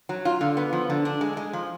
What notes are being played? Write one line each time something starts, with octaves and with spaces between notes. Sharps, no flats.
F#3
F4
D3
B3
F3
D3
D4
G#3
G#3
F3